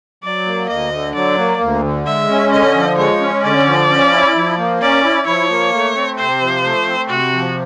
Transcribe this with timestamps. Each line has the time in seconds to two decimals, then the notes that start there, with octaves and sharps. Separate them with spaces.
0.23 F#3 D5
0.46 A#3
0.69 D2 D#5
0.93 D3
1.15 F#3 D5
1.38 A#3
1.61 D2
1.83 D3
2.06 G#3 E5
2.29 C#4
2.52 D3 D#5
2.76 F3
2.98 G#3 C#5
3.21 C#4
3.44 D3 D5
3.66 F3
3.89 C#4
4.12 E4
4.36 F3
4.58 A#3
4.81 C#4 D5
5.04 E4
5.27 F3 C#5
5.50 A#3
5.73 A3
5.95 C4
6.18 C3 C5
6.41 F3
6.65 A3
6.87 C4
7.09 C3 F#4
7.33 F3